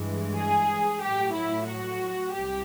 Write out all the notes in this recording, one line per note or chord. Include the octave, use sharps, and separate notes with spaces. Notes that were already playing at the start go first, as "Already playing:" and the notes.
Already playing: G2 E3 G#3
G#4
A2 F#3 G4
E4
F#4
C2 C3 G4